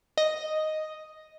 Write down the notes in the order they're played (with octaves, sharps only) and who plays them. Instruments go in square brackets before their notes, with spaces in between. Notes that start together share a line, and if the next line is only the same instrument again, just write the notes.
[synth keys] D#5